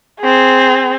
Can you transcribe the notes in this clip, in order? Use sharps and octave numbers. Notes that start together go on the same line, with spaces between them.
C4 G#4